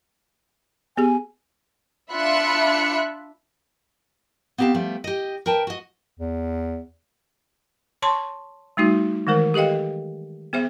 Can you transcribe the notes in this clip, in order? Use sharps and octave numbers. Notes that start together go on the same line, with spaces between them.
B3 G4 G#4 G#5
D4 F4 E5 B5 F#6 C#7
B3 C4 G4 F5 A5
F3 G3 A3 B3
G4 D#5
A#4 B4 G5 A5
F#4 D#5
E2
C#5 A5 C6 C#6
G3 A3 D#4 F#4
D#3 E3 G#3 A#4 C5
G4 A4 D#5 F5 G5
B3 G#4 C5 E5